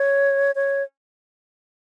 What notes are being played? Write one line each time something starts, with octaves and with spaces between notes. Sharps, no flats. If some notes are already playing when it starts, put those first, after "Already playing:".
Already playing: C#5
C#5